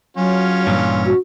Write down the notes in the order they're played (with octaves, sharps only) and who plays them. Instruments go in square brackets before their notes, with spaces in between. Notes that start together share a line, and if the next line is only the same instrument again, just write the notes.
[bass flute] F#3 [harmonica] C#4 F4
[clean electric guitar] G2 A#2 E3
[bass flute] F#4